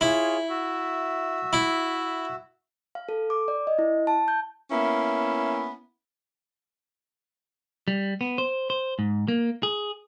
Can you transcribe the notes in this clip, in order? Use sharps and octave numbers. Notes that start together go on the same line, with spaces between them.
E4 F4 G#4 C#5
F#4 E5
E4
F5
A4
D6
D5
D#5
E4
A5
G6
A#3 B3 C#4 E4
G3
B3
C5
C5
G#2
A#3
G#4